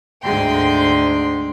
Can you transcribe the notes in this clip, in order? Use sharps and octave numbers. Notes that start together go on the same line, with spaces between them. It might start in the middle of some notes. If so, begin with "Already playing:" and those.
D2 G#2 D3 G#3 G5 C6